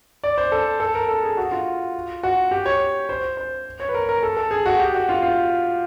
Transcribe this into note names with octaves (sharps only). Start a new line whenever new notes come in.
D5
C5
A4
A4
A#4
A4
G#4
F#4
F4
F#4
G4
C#5
C5
C5
C#5
B4
A#4
A#4
A4
A4
G#4
F#4
G4
F#4
F4
F4